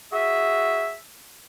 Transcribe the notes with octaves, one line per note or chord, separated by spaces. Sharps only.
F#4 G#4 E5